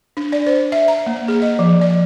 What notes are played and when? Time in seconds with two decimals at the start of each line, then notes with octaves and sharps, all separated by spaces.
0.17 D4
0.32 D5
0.47 C5
0.72 E5
0.88 A#5
1.06 A#3
1.28 G#4
1.42 D#5
1.59 F3
1.81 D5